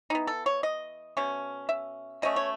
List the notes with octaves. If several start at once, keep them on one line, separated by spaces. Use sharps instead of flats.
E3 B3 D#4
A4
C#5
D#5
B2 A3 C#4
E5
B2 A3 C#4 D#5
C#5